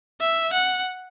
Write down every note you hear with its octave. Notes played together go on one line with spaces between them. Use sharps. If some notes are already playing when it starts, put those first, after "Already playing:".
E5
F#5